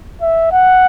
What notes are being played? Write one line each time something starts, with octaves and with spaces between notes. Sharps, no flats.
E5
F#5